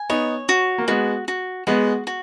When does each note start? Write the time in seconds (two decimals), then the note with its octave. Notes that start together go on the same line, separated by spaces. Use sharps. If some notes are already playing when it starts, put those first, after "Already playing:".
Already playing: G#5
0.10 B3 D#4 C#5
0.49 F#4
0.78 A#3
0.88 G#3 B3 F#4
1.28 F#4
1.67 G#3 B3 F#4
2.07 F#4